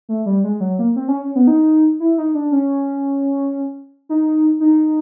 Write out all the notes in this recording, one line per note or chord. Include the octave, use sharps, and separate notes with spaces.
A3
G3
G#3
F#3
A#3
C4
C#4
C#4
B3
D#4
E4
D#4
D4
C#4
D#4
D#4